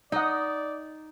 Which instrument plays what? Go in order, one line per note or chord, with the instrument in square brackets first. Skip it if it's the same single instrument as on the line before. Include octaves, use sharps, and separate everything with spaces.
[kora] D#4 [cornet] D5 [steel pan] D#5 F#5